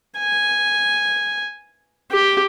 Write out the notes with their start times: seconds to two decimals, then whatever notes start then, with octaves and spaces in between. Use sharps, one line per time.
0.19 G#5
2.12 G4